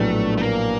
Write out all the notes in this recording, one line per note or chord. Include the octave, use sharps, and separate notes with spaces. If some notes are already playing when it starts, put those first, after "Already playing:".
Already playing: A#1 A2 F#3 A3 B3 D4
A3
A#3